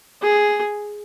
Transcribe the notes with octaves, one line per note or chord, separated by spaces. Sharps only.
G#4